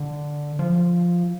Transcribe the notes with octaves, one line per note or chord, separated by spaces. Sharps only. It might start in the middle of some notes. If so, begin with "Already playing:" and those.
Already playing: D3
F3